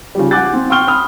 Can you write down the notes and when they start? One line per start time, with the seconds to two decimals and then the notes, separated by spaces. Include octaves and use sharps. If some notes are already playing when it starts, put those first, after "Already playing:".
0.15 C#3 F3 G3
0.31 F#5 G#5 D6 F#6 G6 A6
0.53 C4
0.70 G5 C6 C#6 F6 G7
0.87 B5 D#6 F6